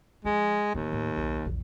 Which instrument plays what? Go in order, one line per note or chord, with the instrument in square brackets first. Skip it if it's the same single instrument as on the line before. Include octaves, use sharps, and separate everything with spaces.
[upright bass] E3 F3 [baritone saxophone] G#3
[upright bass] D1 [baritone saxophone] D#2
[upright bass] A2
B1
A#1 E2